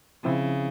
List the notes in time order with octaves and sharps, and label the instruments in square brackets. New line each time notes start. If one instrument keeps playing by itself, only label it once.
[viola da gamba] C#3 [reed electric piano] F3 C4 E4